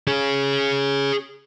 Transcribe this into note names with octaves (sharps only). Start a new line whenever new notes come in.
G#4 C#5